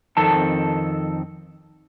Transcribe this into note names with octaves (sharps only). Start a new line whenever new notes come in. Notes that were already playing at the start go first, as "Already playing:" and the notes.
F2 D#3 C4 A4 A5